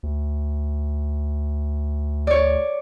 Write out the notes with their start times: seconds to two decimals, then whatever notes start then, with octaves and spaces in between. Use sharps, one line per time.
0.03 D2
2.27 C#5 D5